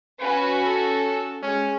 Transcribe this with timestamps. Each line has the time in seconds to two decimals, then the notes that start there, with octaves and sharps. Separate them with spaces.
0.20 C#4 F#4 B4
0.66 A4
1.42 G#3 C#4